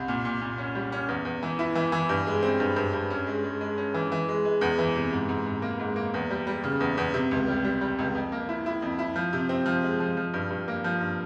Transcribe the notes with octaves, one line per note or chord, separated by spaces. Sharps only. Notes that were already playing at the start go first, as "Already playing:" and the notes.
Already playing: C2
A#2
A#2
A#2
C#4
G3
C#4
E2
E2
E3
E4
E3
E3
G2
G#3
C4
G2
G2
G2
C#4
G#3
G#3
G#3
C#4
E3
E3
G#3
G#3
E2
E3
C3
G#2
G#2
G#2
A#3
G#2
A#3
E2
G3
G3
C#3
E2
E2
C3
C#2
G3
G3
G3
C#2
F2
A#3
E4
E4
F2
E4
F3
C3
C4
F3
G#3
F3
F3
G2
G2
A#3
F3
G2